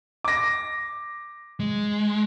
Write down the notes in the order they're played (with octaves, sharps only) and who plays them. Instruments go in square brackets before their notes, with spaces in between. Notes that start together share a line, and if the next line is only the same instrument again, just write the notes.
[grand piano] D6 A#6
[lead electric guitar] G#3